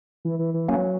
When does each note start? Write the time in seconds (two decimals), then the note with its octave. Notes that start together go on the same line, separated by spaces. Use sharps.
0.25 E3
0.39 E3
0.54 E3
0.69 F#3 A#3 C#4